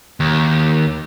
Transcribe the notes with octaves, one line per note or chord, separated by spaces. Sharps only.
D#2